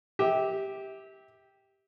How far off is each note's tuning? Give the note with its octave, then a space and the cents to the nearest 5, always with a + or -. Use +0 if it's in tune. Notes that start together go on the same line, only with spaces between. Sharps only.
G4 +0 E5 -30